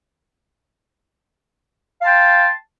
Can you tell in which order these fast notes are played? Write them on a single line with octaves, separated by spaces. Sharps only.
F5 A5 C6 G5